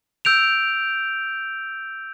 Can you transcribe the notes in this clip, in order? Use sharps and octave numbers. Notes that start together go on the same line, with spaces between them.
E6 G6 D7 F7